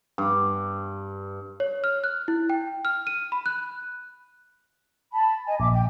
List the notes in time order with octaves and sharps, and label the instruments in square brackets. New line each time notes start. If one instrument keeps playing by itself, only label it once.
[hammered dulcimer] G2
[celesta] C#5
F6
F#6
E4
G5
F6
D#7
B5
F#6
[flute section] A5 B5
D#5 G#5
[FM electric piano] A#1 [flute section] E5 D6
[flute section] G5